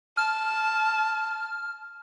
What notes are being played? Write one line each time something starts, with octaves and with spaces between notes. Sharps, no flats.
A5 F6